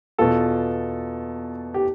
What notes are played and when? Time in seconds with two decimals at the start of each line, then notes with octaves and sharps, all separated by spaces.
0.18 E2 B2 F4 A4
1.74 G4